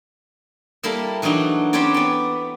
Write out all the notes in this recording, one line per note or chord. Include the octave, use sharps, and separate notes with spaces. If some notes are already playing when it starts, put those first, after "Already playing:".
G3 A#3 E4 A4
E3 F#3 D4 D#4 F#4
C4 C#4 G4 B4 C#5 D5
B3 D5